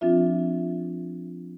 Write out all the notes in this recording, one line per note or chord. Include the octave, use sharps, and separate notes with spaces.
F3 C4 D4 F4 E5